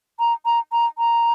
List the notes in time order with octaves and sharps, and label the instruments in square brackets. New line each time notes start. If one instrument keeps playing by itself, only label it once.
[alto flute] A#5
A#5
A#5
A#5